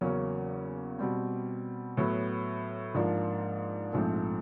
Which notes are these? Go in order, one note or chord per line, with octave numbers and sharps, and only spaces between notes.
E2 C#3 F#3 A#3 C#4
B2 G3 C4
A2 F#3 B3
G#2 F3 A#3 D4 F4
A#1 G#2 F3 A3 C4